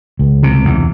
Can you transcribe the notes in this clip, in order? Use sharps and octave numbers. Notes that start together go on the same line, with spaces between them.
C#2
C3
E2